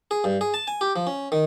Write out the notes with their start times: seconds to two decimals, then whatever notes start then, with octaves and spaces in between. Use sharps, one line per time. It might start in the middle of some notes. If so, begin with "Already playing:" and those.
0.11 G#4
0.24 G2
0.41 G#4
0.54 A5
0.68 G#5
0.81 G4
0.96 F3
1.07 C#4
1.32 D#3